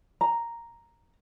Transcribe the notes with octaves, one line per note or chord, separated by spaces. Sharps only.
A#5